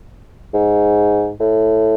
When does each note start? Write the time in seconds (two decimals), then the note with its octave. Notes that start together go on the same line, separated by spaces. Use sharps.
0.54 G#2
1.40 A2